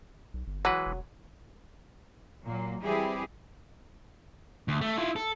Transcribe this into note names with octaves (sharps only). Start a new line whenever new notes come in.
B1
G1
E3 F#3 G#3 B4
E1
A#2 F#3 A#3
E3 G3 C4 E4 G4 G#4
D2
A3
E4 F4
A4